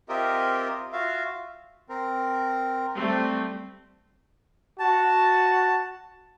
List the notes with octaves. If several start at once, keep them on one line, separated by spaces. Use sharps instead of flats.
C4 F4 G4 A#4 D#5 E5
F4 F#4 E5 F5
C4 A#4
G3 A3 C4
F#4 A5